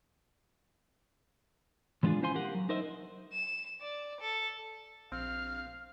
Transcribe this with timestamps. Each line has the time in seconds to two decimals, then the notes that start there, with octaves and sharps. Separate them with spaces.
2.03 E3 G#3 B3 D4 F4 G#4
2.22 C#4 E4 C5 F5 G#5 C6
2.35 G4 A#4 F5 F#5
2.55 F#3
2.69 D#4 A#4 C5 D#5 E5
3.33 E7
3.81 D5
4.21 A4
5.12 A#1 C4 F5 F6